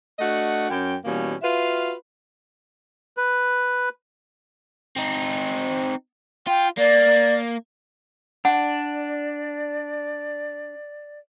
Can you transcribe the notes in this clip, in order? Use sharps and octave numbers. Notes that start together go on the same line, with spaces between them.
A3 D4 F#4 D#5 F#5
F#2 C#4 G5
B2 E3 G3 A#3 C#4
F4 F#4 B4 E5 F5
B4
C4 D#4
F4 G5
A#3 D5
D4 D5 F#5